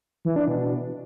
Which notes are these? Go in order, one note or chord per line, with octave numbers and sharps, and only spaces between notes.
E3
D4
B2